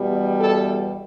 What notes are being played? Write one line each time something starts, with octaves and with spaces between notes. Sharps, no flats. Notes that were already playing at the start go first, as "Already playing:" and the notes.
Already playing: E2 B2 G3
A4